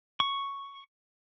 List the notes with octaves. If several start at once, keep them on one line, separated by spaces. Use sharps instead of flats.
C#6